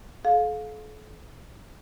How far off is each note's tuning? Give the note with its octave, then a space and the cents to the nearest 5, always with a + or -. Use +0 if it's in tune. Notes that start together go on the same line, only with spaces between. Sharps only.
A4 -45 F5 +20